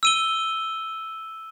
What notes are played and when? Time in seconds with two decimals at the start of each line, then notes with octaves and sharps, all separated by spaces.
0.03 E6 D#7 G7